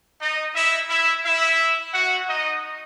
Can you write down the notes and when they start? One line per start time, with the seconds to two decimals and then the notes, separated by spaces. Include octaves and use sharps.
0.20 D#4 D#5
0.55 E4 E5
0.90 E4 E5
1.25 E4 E5
1.94 F#4 F#5
2.29 D#4 D#5